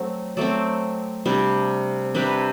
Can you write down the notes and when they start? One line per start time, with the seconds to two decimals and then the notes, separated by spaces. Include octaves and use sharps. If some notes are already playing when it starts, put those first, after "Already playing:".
Already playing: F#3 A3 C4
0.37 F#3 A3 C4 D5
1.26 C3 G3 D4
2.14 C3 G3 D4 B4